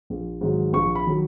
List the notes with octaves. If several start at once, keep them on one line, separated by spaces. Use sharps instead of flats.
A#1
G#2 D#3 F#3
A#1 C#6
B5
D#3 F#3